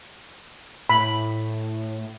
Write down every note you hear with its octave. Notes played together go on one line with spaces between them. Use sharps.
A2 B5